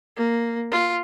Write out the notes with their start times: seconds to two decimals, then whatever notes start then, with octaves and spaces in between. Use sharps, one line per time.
0.17 A#3
0.71 F4